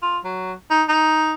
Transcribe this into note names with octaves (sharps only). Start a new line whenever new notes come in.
F4
F#3
D#4
D#4